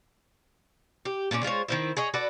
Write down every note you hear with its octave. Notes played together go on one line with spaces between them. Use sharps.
G4
A#2 C#4 F4 D5
G#3 F4 C5 C#5
D#3 C4 E4
G#4 C#5 D#5
F#4 A4 B4 D5